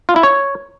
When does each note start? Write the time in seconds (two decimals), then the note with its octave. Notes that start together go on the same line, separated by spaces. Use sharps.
0.09 F4
0.16 E4
0.23 C#5